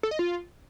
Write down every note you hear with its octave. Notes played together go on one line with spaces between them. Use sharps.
A4
D#5
F4